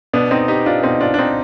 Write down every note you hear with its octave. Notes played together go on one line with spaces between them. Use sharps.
B2 B3 D4
C4 D#4
D#4 G4
D4 F4
B2 C4 D#4
D4 F4
D4
C4 D#4